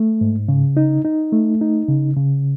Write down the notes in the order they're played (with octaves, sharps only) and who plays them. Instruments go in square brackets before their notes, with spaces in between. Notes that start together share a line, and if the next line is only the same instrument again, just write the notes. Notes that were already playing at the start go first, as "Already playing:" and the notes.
Already playing: [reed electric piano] A3
G#2
C#3
D#4
D#4
A3
D#4
C#3
C#3